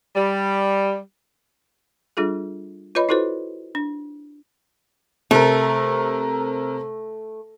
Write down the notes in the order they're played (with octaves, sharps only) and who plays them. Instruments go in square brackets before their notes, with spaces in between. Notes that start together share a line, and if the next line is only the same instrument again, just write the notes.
[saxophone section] G3
[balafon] G3 D4 F4 G#4 A4
F4 B4 C#5 D#5 B5
E4 F#4 A4 B4 C5
D4
[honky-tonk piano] C3 A#4 [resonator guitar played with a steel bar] A3